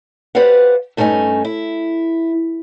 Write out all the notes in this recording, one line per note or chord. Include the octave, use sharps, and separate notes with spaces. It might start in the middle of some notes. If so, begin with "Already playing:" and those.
G4 B4 C5 D5 F5 F#5
G2 A3 C#4 D#4 G#5
E4